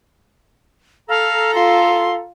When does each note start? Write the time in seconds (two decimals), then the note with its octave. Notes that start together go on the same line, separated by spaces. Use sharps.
1.09 A4 F5 A#5
1.55 F4 C6